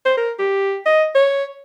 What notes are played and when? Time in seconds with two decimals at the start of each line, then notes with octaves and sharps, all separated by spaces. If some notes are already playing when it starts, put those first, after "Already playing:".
0.06 C5
0.17 A#4
0.39 G4
0.86 D#5
1.15 C#5